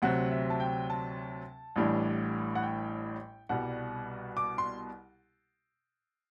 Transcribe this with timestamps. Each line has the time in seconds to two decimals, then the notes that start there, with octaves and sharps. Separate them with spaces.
0.02 D2 C3 F#3 C4 F#5
0.32 E5
0.50 A5
0.60 G5
0.90 A5
1.76 A1 A2 E3 G3 D4
2.55 F#5
2.63 G5
3.49 C2 B2 G3 F#5
4.37 D6
4.58 C6